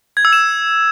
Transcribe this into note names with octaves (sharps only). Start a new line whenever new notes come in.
G#6
E6
E7